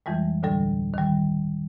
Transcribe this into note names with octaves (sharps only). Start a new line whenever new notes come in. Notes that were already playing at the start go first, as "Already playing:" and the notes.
F2 E3 G3 G#3
D2 A2 D3 G3 A4
D#3 G3